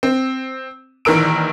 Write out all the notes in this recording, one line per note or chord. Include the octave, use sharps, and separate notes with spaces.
C4
A#1 D#3 E3 A#4 E6 D7